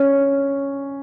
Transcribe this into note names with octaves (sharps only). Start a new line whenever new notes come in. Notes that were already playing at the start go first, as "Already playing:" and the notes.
Already playing: C#4